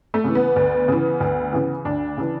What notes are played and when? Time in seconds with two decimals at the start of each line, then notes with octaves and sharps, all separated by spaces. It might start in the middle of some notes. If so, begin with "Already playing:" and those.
0.14 A3
0.24 C#3 E3
0.35 B3
0.56 D2
0.88 C#3 E3
1.20 D2
1.53 C#3 E3
1.85 D2 D4
2.17 C#3 E3